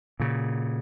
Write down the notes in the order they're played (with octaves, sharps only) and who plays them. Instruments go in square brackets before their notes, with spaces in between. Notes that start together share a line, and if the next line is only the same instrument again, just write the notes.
[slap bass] A#2 C#3